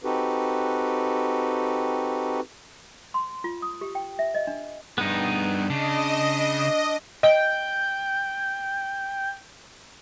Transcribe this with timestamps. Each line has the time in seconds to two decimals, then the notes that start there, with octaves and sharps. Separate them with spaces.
0.04 C4 D#4 F#4 G4 A4 B4
3.14 C6
3.44 F4
3.62 D#6
3.81 G4
3.95 G5
4.19 E5
4.35 D#5
4.47 D4
4.98 G2 B3 D#4 G#4
5.70 C#3 D4 D#5
7.23 D#5 G5